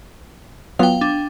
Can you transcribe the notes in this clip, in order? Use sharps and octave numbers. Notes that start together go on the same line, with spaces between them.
F#3 B3 F4 F5 G5
D4